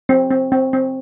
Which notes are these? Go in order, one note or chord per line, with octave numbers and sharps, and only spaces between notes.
C4
C4
C4
C4